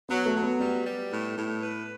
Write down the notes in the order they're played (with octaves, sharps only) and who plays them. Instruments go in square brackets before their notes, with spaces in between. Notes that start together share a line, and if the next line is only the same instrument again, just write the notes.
[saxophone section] F#3 [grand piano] B3
[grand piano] A3
[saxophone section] F#3
[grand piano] B3
[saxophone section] G3 [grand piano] B3
[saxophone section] G3
A2
A2
B4